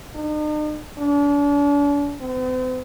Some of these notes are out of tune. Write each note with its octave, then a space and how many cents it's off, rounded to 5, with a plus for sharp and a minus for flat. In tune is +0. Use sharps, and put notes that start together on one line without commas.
D#4 -45
D4 -40
C4 -45